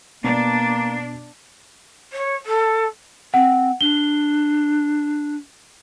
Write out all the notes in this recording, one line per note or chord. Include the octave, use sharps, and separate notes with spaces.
B2 A#3 D4
C#5
A4
C4 F#5
D4 G7